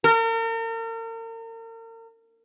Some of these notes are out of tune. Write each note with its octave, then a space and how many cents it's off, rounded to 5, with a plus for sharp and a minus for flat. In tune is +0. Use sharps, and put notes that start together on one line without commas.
A#4 -40